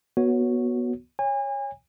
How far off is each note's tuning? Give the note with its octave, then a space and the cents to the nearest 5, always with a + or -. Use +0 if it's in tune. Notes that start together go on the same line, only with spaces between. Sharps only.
B3 -20 F#4 +0 C#5 +0
C#5 +0 G#5 -35